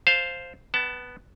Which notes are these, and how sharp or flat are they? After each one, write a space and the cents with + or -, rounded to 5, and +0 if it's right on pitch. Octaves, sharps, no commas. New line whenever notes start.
C5 +0 F5 +0 A5 +0
B3 +0 F#5 +40 A5 +0